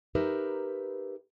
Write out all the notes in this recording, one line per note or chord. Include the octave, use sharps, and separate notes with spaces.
D#4 G4 A#4 B4 E5